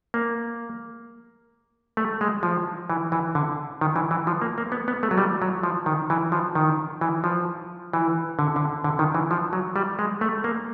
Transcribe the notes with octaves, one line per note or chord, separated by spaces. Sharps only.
A#3
A3
G#3
F3
E3
E3
D3
D#3
E3
E3
F3
A#3
A#3
B3
B3
A3
F#3
G3
F#3
F3
D#3
E3
F3
D#3
E3
F3
E3
D3
D3
D3
D#3
E3
F3
F#3
G3
G#3
A3
A#3